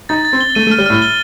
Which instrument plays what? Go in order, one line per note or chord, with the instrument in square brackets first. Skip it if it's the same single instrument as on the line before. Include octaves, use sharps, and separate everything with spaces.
[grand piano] D#4 [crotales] A6
[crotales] A6
[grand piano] C4
[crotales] G7
[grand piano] A3 [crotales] D#7
[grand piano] A3
[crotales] F6
[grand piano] G3
[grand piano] A2 [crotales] F6
[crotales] G7